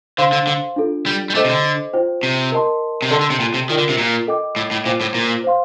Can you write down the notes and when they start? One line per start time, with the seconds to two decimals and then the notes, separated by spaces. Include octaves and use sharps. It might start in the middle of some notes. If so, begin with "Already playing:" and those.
0.18 D3 C5 F5 C6
0.33 D3
0.47 D3
0.76 D4 F4 A4
1.06 G3
1.30 G3
1.35 A3 A4 C5 D#5 G5 D6
1.45 C3
1.49 D3
1.93 F4 C5 G5
2.23 C3
2.52 A#4 D#5 A5 C6
3.02 C3
3.10 D3 A4 D5 A5 C6
3.21 D3
3.30 C3
3.40 A#2
3.54 C3
3.69 D#3 F4 A#4 D5 G5
3.78 D3
3.89 C3
3.98 A#2
4.27 A4 D#5 G5 D6
4.56 A2
4.71 A2
4.85 A#2 C5 G5 D6
5.01 A2
5.15 A#2
5.44 C5 F5 C6